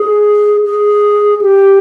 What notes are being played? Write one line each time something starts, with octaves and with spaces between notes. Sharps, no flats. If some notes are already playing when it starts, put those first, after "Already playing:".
Already playing: G#4
G#4
G4